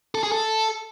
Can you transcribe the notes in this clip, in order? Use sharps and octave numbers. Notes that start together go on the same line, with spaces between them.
A4
G#4
A4